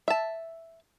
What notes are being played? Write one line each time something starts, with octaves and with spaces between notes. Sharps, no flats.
E5 A5